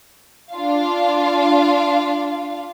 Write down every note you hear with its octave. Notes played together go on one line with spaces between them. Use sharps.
D4 F4 F5